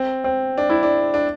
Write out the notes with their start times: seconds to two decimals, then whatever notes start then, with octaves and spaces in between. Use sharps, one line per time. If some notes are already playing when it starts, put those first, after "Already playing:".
Already playing: C4
0.24 C4
0.58 D4
0.70 E4
0.83 D4
1.14 D4